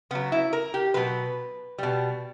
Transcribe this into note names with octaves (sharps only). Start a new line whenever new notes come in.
C#3 F#3 B3
E4
A#4
G4
B2 F#3 B4
B2 G3